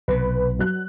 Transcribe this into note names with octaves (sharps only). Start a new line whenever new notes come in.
B1 C3 B4
F#3 F#6